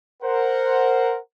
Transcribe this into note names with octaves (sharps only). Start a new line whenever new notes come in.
A#4 C5 F#5